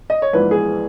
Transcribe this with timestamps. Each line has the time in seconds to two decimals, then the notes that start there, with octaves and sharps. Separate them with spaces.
0.10 D#5
0.22 C#5
0.33 A#1 G#2 E3 B3 B4
0.51 G#4